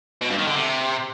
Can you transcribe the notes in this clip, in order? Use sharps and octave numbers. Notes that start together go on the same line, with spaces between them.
B2
G2
D#3
D3
C3